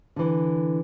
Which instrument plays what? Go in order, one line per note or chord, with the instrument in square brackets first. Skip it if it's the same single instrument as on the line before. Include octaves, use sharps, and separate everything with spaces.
[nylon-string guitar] D3 E3